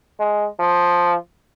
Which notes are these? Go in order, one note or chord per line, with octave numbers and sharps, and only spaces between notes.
G#3
F3